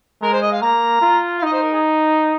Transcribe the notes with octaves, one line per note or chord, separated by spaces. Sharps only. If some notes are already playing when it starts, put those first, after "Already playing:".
G#3 A#4
C5
D#5
F5
A#3 A#5
F4
F5
D#4 D#5
C5
A#4
G#4